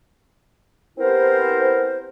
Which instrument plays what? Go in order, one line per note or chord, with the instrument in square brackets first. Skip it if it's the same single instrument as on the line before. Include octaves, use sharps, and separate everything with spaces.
[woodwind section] B3 C4 E4 G4 A#4 C5